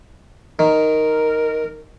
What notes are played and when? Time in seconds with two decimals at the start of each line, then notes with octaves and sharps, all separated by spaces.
0.59 D#3 A#4